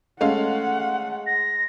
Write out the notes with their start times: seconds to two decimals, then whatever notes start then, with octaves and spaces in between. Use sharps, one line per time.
0.21 G#3 A3 C#4 F5 F#5
1.26 A#6